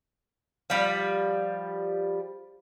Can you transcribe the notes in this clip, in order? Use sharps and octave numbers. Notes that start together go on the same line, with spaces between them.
F3 G3